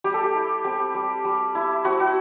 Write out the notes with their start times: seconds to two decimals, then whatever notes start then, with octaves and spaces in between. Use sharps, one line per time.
0.04 G3 G4
0.14 A4
0.23 G4
0.35 E4
0.65 C4 G4
0.94 G3
1.25 G3
1.55 E4
1.84 C4 F#4
2.00 F#4